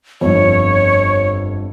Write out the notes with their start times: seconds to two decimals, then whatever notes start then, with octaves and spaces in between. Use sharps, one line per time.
0.21 G1 F2 C#5